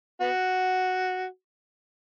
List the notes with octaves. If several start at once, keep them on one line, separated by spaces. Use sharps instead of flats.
B3 F#4